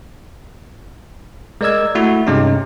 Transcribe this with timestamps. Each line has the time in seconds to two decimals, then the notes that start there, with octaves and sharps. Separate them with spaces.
1.61 G#3 A#4 D5 D#5 E6 G#6
1.95 A3 E4 F#4
2.27 G2 C3 G#3 C#4 D#4